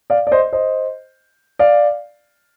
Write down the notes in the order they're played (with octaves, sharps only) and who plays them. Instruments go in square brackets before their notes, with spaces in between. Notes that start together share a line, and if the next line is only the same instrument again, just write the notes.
[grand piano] D5 F5
D5
C5 D#5
C5 D#5
D5 F5